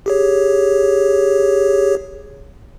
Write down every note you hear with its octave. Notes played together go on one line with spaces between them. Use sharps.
G4 G#4 C#5